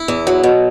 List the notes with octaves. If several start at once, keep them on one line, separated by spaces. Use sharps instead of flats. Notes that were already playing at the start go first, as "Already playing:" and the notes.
Already playing: E4
E2
F#3
B2